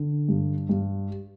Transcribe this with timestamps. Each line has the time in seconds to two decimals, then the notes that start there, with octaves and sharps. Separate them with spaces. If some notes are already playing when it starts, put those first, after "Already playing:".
Already playing: D3
0.29 G2
0.69 G2